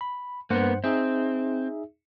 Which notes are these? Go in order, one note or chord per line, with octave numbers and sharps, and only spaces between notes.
B5
G2 A#3 B3 C5 F#5
C4 D#4 G#4 E5